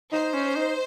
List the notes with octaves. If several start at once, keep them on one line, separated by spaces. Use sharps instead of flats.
D#4 C5
C#4
D#4